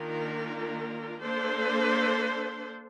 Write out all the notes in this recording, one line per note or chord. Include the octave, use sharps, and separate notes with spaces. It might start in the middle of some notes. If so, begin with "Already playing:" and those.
Already playing: D#3 A#3 D4 F4 A#4
A#3 D4 A4 C5